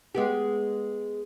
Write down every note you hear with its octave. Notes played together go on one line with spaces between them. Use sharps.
G#3 B3 G4